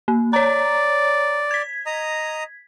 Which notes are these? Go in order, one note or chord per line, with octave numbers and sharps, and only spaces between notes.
A#3
C#5 D5 A#5
G#6 B6
D#5 A#5 D#6